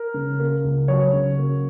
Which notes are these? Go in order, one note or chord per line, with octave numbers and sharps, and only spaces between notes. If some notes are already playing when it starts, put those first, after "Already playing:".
Already playing: A#4
C#3
A#3
C#2
F#3 C#5
C#3
A#3